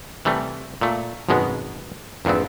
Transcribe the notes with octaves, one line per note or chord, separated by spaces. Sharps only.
C3 E3 G3 A3
A#2 A3
G#1 F#2 B2 G#3 B3
A#1 E2 G2 B3 C4